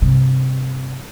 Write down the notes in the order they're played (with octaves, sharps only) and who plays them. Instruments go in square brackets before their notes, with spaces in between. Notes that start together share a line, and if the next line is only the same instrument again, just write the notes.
[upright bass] G2 C3